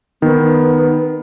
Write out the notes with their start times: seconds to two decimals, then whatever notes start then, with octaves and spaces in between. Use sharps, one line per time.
0.22 D#3 B3